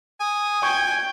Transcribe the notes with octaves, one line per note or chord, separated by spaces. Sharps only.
G#5 D#6
G5 C#6 G#6